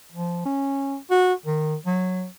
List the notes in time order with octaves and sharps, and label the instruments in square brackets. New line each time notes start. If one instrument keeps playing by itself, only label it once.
[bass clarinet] F3
C#4
F#4
D#3
F#3